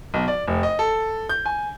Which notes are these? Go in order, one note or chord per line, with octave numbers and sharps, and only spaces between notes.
B1
D5
F1
D#5
A4
G6
G#5